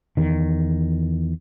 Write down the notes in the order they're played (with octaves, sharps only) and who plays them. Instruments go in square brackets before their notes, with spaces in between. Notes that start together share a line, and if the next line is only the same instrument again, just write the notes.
[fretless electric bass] E2 D#3